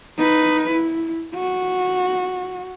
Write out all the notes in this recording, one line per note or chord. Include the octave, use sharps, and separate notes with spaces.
D#4 B4
E4
F#4